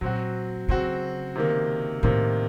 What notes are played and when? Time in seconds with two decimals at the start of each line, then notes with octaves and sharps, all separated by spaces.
0.01 A#2 F#3 C4 F#4
0.68 C#3 F#3 C4 F#4
1.36 C3 D#3 A#3
2.03 A2 C3 D#3 A#3